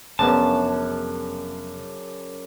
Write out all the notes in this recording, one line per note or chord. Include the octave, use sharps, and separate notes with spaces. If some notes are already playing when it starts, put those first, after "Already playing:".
F1 F#2 C#3 B3 D4 A5